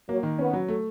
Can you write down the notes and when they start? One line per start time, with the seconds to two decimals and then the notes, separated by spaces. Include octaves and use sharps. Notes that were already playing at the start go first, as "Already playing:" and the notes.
0.09 F#3 A#3
0.23 D#3
0.39 B3 C#4
0.53 F#3
0.68 A3